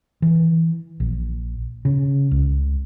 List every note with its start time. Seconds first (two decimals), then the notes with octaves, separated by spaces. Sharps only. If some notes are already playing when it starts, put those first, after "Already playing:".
0.22 E3
1.00 A#1
1.85 C#3
2.31 C#2